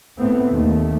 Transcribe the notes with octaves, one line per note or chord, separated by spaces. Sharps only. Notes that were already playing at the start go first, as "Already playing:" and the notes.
A2 A3 B3 C4
D#2 D#3 A3